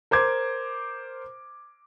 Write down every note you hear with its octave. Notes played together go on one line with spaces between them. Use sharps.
A#4 C5 D6 G#6